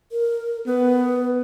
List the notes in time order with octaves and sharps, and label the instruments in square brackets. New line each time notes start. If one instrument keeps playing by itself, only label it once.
[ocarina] A#4
[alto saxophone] B3 [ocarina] B4